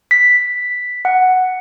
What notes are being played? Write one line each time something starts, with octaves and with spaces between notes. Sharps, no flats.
B6
F#5